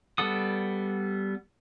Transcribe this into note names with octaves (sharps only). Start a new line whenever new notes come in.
G3 B3 A4 F#5 D#6